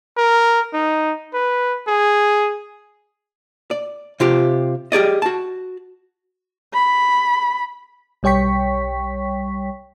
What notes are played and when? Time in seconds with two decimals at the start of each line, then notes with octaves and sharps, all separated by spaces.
0.17 A#4
0.73 D#4
1.34 B4
1.87 G#4
3.71 D5
4.20 C3 F4 G4
4.92 G4 G#4 D5 D#5
5.22 F#4 A5
6.74 B5
8.23 B1 G3 C#5 G5 C#6 B6